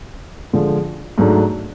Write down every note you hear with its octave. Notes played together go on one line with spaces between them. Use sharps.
D3 F3 G#3
G#2 F#3 A3 D4